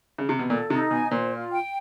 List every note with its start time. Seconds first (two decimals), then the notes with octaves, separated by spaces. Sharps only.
0.18 C#3
0.29 C3
0.39 B2
0.50 A#2 A4
0.70 C3 D#4
0.91 B2 G#5
1.11 A#2 C5
1.31 F4
1.52 G5